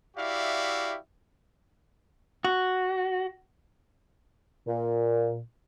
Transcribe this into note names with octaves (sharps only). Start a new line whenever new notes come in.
E4 F#4 G4 D5 E5 F5
F#4
A#2